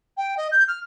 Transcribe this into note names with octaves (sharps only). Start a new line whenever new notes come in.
G5
D#5
G6
F6